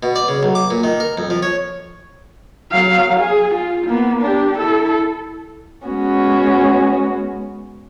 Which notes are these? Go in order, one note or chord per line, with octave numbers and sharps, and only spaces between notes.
B2
D5
C#3
B1
D6
A#2
D#3
A#4
F2
F3
C#5
F#3 F5
G#4
F4
A#3 B3
D4 G4
E4 A4
G#3 B3 C#4 F#4